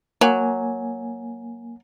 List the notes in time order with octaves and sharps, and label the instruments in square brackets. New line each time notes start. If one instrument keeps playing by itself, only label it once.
[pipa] F#3 [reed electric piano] A#3 G#5